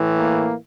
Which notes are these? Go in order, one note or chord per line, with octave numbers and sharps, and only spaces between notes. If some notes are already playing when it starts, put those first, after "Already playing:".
Already playing: A2 E3
A#3